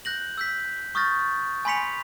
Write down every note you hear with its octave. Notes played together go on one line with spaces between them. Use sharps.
F#6 G6 A#6 F#7
E6 G6 B6
C#6 D#6 F6 G6 A6 A#6
G#5 B5 C6 B6 C#7 F7